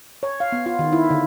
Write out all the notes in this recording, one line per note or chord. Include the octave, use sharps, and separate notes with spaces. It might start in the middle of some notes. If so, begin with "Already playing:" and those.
C#5
F5
B3
F4
D#3
E4
D3